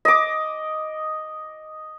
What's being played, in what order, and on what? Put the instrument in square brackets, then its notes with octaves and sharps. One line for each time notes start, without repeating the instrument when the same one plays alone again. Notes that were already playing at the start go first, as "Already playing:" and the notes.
[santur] D#5 D6